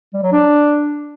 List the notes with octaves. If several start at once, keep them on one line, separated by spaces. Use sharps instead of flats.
G3
F#3
D4